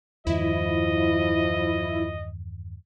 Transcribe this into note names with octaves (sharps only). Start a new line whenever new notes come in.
E2 G2 D#3 F3 E4 D#5